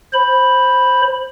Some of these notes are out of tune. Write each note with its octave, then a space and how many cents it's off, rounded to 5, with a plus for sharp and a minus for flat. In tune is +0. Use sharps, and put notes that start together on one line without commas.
C5 +10 B5 +0